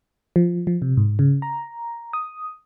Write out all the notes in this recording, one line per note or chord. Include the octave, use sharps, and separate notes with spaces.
F3
F3
C3
G#2
C#3
A#5
D#6